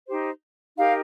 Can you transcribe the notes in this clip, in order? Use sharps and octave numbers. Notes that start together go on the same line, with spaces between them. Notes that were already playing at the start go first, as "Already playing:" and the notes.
D#4 G4 C5
D#4 G4 A#4 F5